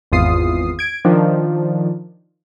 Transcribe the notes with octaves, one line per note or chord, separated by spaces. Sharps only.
G#1 E2 F4 D#6 C7
G#6 D7
D#3 F3 D4